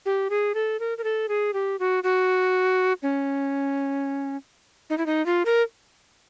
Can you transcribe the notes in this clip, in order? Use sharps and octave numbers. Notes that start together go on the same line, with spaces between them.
G4
G#4
A4
A#4
A#4
A4
G#4
G4
F#4
F#4
C#4
D#4
E4
D#4
F4
A#4